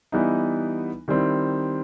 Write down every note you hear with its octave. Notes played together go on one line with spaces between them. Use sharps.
E3 G3 B3 D#4
D#3 G3 C4 E4